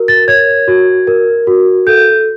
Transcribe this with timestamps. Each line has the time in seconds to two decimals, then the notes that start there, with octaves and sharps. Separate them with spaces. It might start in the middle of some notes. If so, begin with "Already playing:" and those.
Already playing: F#4 A#4
0.08 A6
0.28 C#5 G#6
0.68 F#4
1.07 A#4
1.47 F#4
1.87 A4 G6